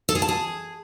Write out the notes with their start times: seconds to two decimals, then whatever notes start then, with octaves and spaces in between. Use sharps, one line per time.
0.09 A4
0.15 G#4
0.22 A5
0.29 G#4